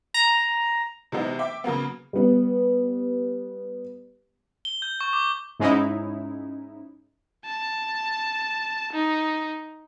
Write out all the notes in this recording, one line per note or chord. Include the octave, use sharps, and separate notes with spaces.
A#5
C3 E3 F#3 G#3 B3 D#4
E5 G5 D6
C#3 F#3 A#3 B3
G3 B3
G7
G6
C#6
D6
G#2 G#3 C#4 D#4 E4
A5
D#4